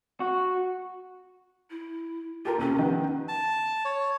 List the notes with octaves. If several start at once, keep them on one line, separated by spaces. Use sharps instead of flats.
F#4
E4
F4 G4 A4 A#4
D#2 C3 C#4
D#3 B3
A5
C#5